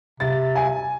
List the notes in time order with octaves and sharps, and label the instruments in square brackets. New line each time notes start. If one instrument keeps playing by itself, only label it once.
[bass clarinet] C3 [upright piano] A6
[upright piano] G#5